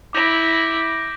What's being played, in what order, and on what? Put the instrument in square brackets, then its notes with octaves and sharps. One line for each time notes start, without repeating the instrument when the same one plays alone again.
[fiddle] E4 [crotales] D6 G6 A#6 D7